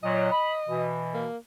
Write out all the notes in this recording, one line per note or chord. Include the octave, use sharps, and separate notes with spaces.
A#2 F#3 D#5
B5
B2 E3
A#3